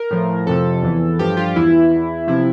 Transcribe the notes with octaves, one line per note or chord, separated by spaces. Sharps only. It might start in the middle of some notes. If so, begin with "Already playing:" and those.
Already playing: A#4
A2 F3
F2 C3 F3 A4
E2 E3
G2 F3 G4
F4
E2 E3 E4
E2 E3
C3 F3 E4